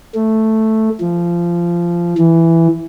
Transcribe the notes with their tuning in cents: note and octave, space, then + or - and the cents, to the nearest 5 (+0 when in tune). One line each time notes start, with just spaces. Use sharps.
A3 +0
F3 -20
E3 +5